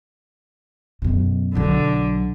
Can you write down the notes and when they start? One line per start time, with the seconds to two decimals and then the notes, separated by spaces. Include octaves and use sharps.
1.02 F#2 B2
1.55 B1 D3 F#3